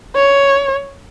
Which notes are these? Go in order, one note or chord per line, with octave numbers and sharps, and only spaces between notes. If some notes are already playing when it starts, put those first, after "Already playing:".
C#5